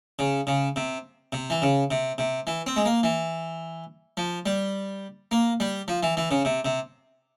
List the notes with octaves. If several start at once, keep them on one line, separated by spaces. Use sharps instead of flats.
C#3
C#3
C3
C3
E3
C#3
C3
C3
E3
C4
G#3
A#3
E3
F3
G3
A#3
G3
F3
E3
E3
C#3
C3
C3